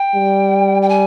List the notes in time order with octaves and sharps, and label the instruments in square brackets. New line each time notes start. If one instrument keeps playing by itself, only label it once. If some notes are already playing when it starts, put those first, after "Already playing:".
Already playing: [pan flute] G5
[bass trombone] G3
[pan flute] G5
G#5